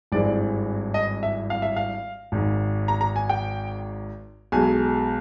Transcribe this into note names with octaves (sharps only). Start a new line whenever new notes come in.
G#1 G2 E3 G#3 C4 D5
D#5
E5
F5
E5
F5
G#1 G#2 D#3
A#5
A#5
G#5
G5
B1 B2 G#3 G#5